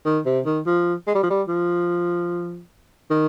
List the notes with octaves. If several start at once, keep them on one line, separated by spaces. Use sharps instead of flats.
D#3
C3
D#3
F3
G#3
G3
F3
G3
F3
D#3